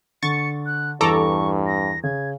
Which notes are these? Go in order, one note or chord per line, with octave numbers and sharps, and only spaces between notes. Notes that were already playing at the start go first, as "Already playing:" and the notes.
D3 C#6 A6 C#7
F#6
E2 G2 A4 A#5 C#6 D6
A#6
C#3 G#6